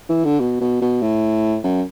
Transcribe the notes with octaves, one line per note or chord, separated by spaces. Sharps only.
E3
D3
B2
B2
B2
A2
F#2